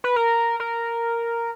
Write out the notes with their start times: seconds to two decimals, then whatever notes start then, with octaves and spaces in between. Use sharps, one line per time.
0.04 B4
0.16 A#4
0.60 A#4